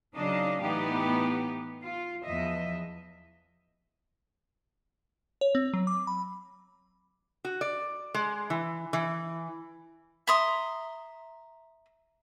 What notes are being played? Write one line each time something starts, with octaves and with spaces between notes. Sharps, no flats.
C#3 F#3 D4 D#4 D#5 F5
A2 E3 B3 D#4 G4
F4
E2 F3 D#5 E5
C#5
C4
F#3
D6
B5
F#4
D5
G#3
E3
E3
E5 A#5 C6 D#6